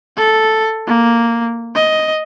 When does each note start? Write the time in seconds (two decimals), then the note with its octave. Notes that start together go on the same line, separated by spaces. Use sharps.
0.17 A4
0.87 A#3
1.75 D#5